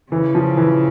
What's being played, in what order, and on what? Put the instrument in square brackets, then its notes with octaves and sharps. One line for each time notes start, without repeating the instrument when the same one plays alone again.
[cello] C#3 [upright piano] E3
[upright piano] F3
E3